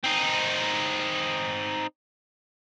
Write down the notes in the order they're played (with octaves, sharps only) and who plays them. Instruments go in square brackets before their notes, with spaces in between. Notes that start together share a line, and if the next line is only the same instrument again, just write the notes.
[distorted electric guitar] C4 D#4